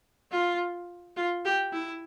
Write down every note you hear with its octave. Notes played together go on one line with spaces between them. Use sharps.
F4
F4
G4
E4